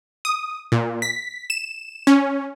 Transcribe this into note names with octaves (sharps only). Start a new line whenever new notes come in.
D#6
A#2
B6
E7
C#4